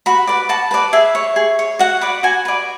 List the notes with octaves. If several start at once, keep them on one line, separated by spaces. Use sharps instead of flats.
F#4 B5
B4 D5
F#4 A5
B4 D5
G#4 E5
C#5
G#4
C#5
F#4 F#5
B4 D5
F#4 G#5
B4 D5